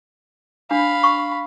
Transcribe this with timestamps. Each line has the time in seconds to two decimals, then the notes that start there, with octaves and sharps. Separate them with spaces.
0.71 D4 F5 B5
1.03 C#6